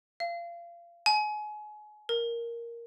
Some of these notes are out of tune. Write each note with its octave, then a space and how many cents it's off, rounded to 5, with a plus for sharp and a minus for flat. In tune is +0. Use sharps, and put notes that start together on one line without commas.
F5 -30
G#5 +30
A#4 +5